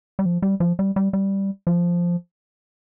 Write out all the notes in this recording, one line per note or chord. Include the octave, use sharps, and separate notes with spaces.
G3
F3
G3
F3
G3
G3
G3
F3